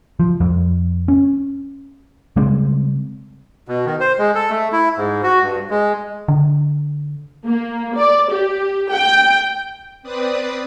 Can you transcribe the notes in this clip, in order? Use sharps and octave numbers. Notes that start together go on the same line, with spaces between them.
F3
F2
C#4
C#3 G3 G#3 C4
B2
D#3
C5
G#3
A4
A3
E4
G#2
F#4
G2
G#3
D3
A#3
D5
G4
G5
C4 B4 D5 D#6